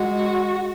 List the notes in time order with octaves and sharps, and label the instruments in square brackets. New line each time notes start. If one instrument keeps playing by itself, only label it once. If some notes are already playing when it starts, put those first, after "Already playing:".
Already playing: [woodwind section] G#3 [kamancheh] F#4